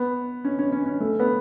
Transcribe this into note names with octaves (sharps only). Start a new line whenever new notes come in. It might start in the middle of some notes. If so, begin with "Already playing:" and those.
Already playing: B3
C#4
C#4
C#4
C#4
A3
B3